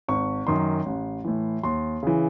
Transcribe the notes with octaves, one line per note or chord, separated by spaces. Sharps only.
G#1 C#6
F#2 D#3 C6
A1
A2 E3
D#2 C6
C#3 E3